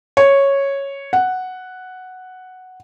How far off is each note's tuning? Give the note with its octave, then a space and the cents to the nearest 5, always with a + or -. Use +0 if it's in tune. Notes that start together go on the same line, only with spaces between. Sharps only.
C#5 -5
F#5 +0